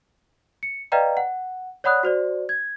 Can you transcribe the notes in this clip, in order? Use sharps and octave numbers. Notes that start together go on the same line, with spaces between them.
C#7
B4 D5 D#5 F5 G5 A#5
F#5
C#5 D5 F#5 B5 D#6 F#6
F#4 C5 D5
G#6